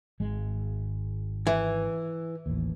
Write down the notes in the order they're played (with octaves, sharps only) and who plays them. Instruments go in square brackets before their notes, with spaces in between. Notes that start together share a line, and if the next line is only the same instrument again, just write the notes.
[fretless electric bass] G#1 G#3
[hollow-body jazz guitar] E3
[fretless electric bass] A1 D#2